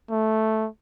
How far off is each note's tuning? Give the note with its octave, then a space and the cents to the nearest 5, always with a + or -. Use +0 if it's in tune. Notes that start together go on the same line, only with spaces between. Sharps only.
A3 -5